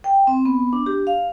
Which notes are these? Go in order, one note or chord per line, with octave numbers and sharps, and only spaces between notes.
G5
C4
B3
D4
G4
F5